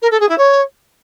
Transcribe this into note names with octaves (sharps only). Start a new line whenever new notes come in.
A#4
A4
G#4
E4
C#5